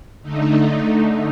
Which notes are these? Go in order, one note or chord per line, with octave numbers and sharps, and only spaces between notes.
D3 A3 D#4